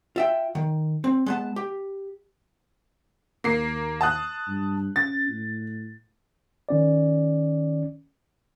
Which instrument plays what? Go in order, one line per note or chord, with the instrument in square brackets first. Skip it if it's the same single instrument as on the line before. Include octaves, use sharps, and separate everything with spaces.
[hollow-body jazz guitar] F4 E5 G5
D#3
C4
G#3 B3 A5
G4
[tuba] D#2 [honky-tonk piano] A#3 C7
[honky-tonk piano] A5 D#6 F#6
[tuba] G2
[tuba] C#4 [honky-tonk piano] A6
[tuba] A2
[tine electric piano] D#3 C#4 D5